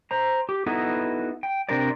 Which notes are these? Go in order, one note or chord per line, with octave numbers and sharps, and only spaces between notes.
C5 A#5
G4
B3 D#4 E4 F#4 A4 B4
G5
C3 C4 D4 G4 A#4 D5